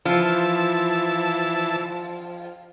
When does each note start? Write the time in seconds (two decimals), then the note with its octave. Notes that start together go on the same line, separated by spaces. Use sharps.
0.05 E3 F3 A5 E6